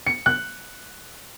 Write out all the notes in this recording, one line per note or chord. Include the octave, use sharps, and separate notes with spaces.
C#7
F#6